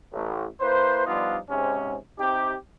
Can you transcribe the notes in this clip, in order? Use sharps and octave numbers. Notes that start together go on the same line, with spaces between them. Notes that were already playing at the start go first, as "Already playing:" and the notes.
A1 A2
A#3 E4 B4 C5
F3 G3 B3 D4 D#4 F4
G#2 C3 C#4
C3 C4 D#4 G4